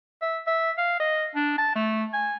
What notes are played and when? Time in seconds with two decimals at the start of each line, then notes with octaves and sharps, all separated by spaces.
0.22 E5
0.47 E5
0.78 F5
1.00 D#5
1.35 D4
1.58 A5
1.75 A3
2.13 G#5